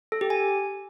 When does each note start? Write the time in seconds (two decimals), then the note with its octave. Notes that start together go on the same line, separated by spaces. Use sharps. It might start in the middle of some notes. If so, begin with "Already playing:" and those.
0.12 A4
0.21 G4
0.30 G#5